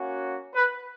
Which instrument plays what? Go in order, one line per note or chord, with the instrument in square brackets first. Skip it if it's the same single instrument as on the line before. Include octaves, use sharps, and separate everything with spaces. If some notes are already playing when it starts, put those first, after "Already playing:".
Already playing: [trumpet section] A#3 C#4 F#4
B4